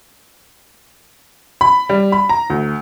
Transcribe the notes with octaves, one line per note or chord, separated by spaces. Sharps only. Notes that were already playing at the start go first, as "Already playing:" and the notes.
B5
G3
B5
A#5
D2